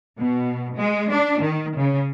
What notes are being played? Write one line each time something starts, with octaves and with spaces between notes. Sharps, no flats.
B2
G#3
D4
D#3
C#3